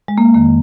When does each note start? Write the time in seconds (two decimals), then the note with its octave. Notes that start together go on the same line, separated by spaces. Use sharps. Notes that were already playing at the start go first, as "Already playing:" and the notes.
0.08 G#3
0.18 A#3
0.34 F2 D#3 A#3